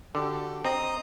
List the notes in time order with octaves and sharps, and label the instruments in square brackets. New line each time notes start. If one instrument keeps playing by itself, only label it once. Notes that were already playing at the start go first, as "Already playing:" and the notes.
[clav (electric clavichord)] D3 [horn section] F#4 G4 A4
[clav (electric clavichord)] C4 [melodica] D#5 A#5 D#6